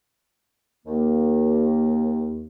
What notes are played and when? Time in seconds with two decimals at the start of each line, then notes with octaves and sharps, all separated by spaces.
0.86 D#2 A#3